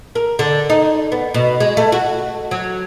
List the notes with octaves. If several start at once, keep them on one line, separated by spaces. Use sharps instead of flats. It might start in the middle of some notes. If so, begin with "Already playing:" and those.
A#4
D3
D#4
B3
B2
G#3
A3
F#4
F#3